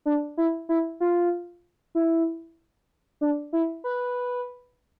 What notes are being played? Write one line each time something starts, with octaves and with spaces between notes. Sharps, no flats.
D4
E4
E4
F4
E4
D4
E4
B4